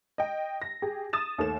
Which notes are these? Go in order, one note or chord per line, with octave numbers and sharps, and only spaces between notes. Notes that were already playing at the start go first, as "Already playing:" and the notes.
D#5 G5
A#6
G4 G#4
D#6 A6 E7
D#2 A3 E7